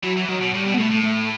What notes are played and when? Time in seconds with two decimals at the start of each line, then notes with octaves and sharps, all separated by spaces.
0.03 E3 F#3
0.16 E3
0.28 D#3 F#3
0.41 B2
0.54 A2 G3
0.66 B2
0.74 B3
0.78 B2 A3
0.91 A2
1.03 A3